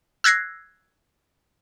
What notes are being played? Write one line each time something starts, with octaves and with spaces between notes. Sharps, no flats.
E6 F#6 G#6 A#6 C7